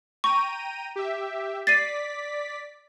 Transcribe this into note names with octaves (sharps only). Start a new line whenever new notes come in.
G5 A#5 C#6 D#7
G4 E5
D5 A6 B6 C7 D#7